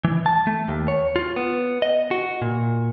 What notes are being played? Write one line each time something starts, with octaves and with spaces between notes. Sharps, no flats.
E3
A5
A3
D#2
C#5
F4
B3
D#5
F#4
A#2